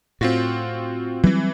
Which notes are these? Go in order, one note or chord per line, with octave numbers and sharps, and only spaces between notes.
A2 C4 F4 F#4
E3 F#3 G3 C4